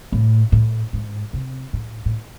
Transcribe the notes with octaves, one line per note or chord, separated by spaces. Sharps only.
A2
A2
G#2
C3
A2
A2